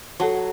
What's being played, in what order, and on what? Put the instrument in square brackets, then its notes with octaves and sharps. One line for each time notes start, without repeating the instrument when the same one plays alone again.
[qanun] F#3 [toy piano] A4 C#5 F#5 A5 C#6